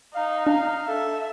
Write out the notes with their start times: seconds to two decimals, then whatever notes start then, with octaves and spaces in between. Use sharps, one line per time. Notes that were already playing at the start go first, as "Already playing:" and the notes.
0.15 D#4 F5
0.47 D4 F5
0.88 A4 E5